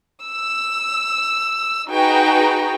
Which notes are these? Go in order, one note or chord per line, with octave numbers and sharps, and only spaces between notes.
E6
D#4 F#4 G#4 B4 G5 A#5